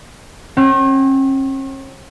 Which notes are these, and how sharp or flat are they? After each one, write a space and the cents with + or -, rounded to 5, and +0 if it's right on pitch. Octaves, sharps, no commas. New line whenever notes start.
C#4 -45 G5 -35